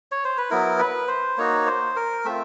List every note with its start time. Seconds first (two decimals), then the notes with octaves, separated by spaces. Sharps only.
0.12 C#5
0.25 C5
0.38 B4
0.50 F#3 B3 E4 A#4
0.79 B4
1.08 C5
1.38 A#3 D#4 F#4 C#5
1.66 C5
1.96 A#4
2.25 A3 C4 F4 E5